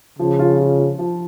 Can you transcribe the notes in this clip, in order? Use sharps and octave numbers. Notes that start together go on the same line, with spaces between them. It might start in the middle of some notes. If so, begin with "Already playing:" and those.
C#3 F3
F4
F4
F3
F3